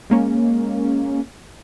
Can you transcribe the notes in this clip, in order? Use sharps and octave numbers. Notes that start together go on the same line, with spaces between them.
G#3 A#3 C#4